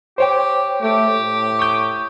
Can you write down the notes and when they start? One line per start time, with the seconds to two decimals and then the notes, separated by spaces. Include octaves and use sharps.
0.18 G4 C5 C#5 G5
0.82 A3 G4
1.18 A2
1.59 C#6 D#6 G6